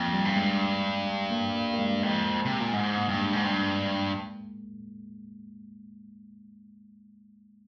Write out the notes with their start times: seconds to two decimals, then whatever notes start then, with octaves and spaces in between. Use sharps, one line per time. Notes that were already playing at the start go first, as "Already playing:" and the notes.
Already playing: F2 A#3
0.13 G3
0.25 G2
0.36 G#3
1.31 A#3
1.55 A#3
1.74 A#3
1.79 G#3
2.02 F2 G#3
2.45 C3
2.60 A#2
2.73 G#2 G#3
2.98 A#3
3.09 G2
3.14 A#3
3.21 G#3
3.33 G#2
3.44 G2